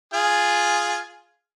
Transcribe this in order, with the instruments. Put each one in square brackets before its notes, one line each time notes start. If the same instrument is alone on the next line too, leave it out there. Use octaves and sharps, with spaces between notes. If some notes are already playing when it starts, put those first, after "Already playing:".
[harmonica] F4 G#4 G#5